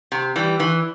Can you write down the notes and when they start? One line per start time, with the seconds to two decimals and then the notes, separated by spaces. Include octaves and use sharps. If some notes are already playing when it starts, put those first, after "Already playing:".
0.12 C3
0.36 E3 G3
0.60 E3